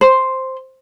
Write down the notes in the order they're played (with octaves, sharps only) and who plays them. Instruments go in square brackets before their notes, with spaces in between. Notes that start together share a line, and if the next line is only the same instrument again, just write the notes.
[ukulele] C5